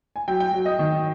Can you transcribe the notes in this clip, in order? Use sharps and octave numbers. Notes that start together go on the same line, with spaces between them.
G#5
F#3 G5
G5
F#3
D#5
D#3